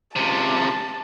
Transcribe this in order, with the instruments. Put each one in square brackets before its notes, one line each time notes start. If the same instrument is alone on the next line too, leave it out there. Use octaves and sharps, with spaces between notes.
[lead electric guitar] C#2 C3 [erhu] A5